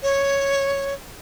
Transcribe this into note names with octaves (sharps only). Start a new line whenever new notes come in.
C#5